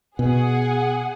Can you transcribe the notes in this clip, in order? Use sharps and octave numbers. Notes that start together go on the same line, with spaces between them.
B2 G#4 F#5